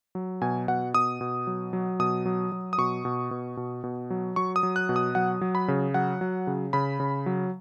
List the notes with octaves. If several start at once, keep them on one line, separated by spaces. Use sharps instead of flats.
F#3
B2 G#5
B2 F#5
B2 D#6
B2
F#3
F#3
B2 D#6
F#3
F#3
D#6
B2 C#6
B2
B2
B2
B2
F#3
F#3 C#6
D#6
F#3
F#6
B2
D#6
F#3 F#5
F#3
B5
C#3
F#3 F#5
F#3
C#3
C#3 B5
C#3
F#3